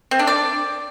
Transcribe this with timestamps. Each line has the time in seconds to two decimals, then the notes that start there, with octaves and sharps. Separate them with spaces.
0.11 C4
0.19 D4
0.27 D5